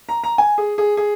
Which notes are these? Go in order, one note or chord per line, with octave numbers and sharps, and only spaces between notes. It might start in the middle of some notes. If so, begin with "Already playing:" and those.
A#5
A#5
G#5
G#4
G#4
G#4